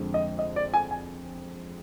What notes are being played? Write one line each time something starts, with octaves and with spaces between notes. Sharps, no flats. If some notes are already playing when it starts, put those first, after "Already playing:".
Already playing: F2 D3 G#3
D#5
D#5
D5
G#5
G#5